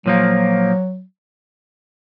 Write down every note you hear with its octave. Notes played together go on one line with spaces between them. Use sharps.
A#2 F3 F#3 A#3